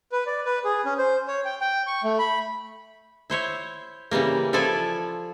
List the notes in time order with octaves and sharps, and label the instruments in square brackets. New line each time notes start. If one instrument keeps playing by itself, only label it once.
[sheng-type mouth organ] B4
D5
B4
G#4
C#4
C5
C#5
G5
G5
C#6
A3
B5
[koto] E4 C5 C#5 E5
C#3 E3 G3 A#3
F3 E4 F4 A4 D5 G#5